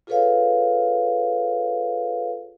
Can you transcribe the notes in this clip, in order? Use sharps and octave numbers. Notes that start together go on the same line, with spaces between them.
F4 G#4 A4 B4 C#5 F5